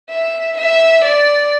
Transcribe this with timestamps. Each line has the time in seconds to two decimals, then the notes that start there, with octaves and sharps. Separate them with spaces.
0.10 E5
0.58 E5
1.05 D5